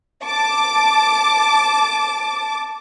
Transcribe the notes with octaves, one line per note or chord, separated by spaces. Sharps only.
A5 D6